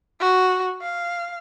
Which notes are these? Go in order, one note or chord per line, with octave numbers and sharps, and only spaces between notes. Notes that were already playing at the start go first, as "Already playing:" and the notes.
F#4
F5